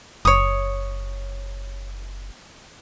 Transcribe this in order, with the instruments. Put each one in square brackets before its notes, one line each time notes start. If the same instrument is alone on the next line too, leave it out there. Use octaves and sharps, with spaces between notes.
[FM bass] F#1 [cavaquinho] C#5 D#6